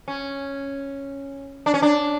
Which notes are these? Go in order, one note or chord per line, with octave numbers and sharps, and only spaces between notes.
C#4
D4
C#4
D4